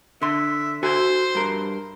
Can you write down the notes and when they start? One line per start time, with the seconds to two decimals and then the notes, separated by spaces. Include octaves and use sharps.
0.22 D3 E5 C6
0.83 F#4 A4 C5 G#5
1.35 G2 A#4